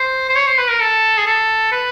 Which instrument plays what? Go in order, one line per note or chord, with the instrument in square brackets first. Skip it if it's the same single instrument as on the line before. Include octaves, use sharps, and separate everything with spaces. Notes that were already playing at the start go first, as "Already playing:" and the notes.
Already playing: [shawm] C5
C5
C#5
C5
B4
A#4
A4
G#4
A4
B4